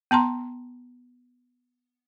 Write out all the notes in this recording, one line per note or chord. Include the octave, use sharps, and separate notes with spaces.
B3 A5 A#5 C6